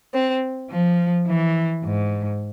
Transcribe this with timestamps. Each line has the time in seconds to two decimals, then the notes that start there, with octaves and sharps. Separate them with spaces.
0.13 C4
0.70 F3
1.27 E3
1.84 G#2